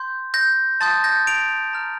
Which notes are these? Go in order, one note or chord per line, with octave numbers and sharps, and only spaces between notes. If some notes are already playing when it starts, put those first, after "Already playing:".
Already playing: C6 G6
G6 A#6
A5 C6 D#6 G6 A6
G6 A#6
D7 F7
A#5 F6